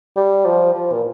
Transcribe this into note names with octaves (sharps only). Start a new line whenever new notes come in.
G3
F3
F3
A#2